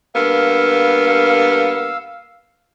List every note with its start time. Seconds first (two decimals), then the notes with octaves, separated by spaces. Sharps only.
0.15 G2 A#3 B3 F5 E6